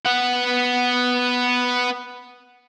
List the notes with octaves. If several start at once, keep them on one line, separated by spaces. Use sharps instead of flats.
B3 F#5